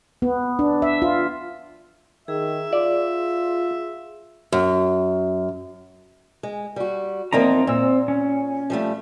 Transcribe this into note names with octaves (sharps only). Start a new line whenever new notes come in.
B3
D4
E5
F4
D#3 G#4 E5
F4 D5
F#2
G#3
G3 F#4
E2 F3 A#3 C4 D#4 A#5
A#2 C4 E6
C#4
F3 G3 A3